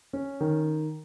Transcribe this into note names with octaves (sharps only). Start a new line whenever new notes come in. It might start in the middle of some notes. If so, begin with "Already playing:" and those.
C#4
D#3